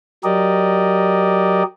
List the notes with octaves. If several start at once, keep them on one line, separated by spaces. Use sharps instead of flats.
F#3 G4 A#4 D5 D#5